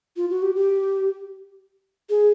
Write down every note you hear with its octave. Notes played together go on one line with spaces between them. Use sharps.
F4
F#4
G4
G4
G#4